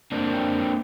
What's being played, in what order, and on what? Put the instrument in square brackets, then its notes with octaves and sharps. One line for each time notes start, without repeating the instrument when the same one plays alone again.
[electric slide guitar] A#3 C4 D4